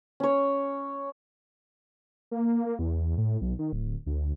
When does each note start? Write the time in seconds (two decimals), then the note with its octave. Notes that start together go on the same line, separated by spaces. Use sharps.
0.20 C#4 C#5
2.31 A#3
2.66 A#3
2.79 E2
3.18 A2
3.42 B1
3.59 D#3
3.73 D1
4.06 D2